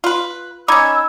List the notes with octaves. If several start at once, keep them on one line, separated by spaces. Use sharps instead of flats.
F4 B4
C#4 D#4 B5 D6 E6 G#6